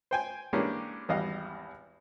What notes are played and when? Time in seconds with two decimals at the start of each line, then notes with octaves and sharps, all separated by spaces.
0.11 C5 G5 G#5
0.53 E3 G#3 A#3 C#4 D4 G4
1.09 G#1 E2 G3 D#5 F5